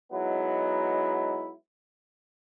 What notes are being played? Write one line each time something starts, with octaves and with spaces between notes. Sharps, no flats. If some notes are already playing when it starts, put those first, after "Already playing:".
F#3 G#3 B3 D#4 E4